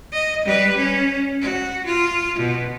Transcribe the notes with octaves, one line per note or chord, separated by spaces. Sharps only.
D#5
G3 B4
C#4
F#4
F4
B2